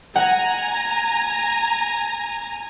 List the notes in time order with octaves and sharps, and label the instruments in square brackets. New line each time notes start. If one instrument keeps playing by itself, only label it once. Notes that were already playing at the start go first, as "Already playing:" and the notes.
[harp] F#5 [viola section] G#5 A#5